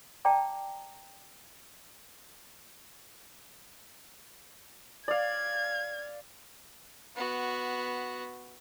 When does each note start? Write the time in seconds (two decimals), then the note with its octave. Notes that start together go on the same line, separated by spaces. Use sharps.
0.25 D5 G5 A5 A#5 D6
5.08 D5 F5 G#6
7.16 B3 F#4